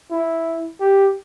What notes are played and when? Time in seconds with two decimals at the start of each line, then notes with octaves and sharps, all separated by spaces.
0.11 E4
0.80 G4